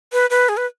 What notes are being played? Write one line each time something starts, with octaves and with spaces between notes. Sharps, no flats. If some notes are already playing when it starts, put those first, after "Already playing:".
B4
B4
G#4
B4